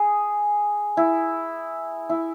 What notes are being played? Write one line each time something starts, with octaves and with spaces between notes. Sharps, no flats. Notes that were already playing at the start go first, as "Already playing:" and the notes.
Already playing: G#4
E4
E4